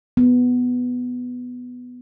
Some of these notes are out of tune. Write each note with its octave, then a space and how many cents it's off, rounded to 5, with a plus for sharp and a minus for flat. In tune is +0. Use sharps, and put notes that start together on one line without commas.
B3 +5